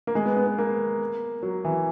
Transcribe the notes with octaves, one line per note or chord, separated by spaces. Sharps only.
A#3
G#3
B3
B3
B3
A#3
F#3
E3